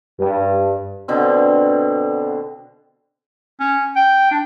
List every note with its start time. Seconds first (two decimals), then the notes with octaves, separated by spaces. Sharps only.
0.20 G2
1.08 B2 D3 C4
3.60 C#4
3.96 G5
4.31 D4